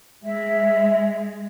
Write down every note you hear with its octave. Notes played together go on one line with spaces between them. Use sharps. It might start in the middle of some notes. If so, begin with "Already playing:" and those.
G#3 E5